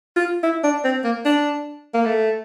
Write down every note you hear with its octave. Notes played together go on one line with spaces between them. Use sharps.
F4
E4
D4
C4
A#3
D4
A#3
A3